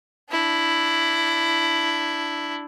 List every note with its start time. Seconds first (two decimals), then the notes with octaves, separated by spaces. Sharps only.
0.30 D4 E4